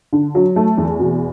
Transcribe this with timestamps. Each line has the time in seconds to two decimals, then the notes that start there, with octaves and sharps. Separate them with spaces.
0.13 D3
0.35 F#3
0.56 A3
0.77 E2
0.99 B2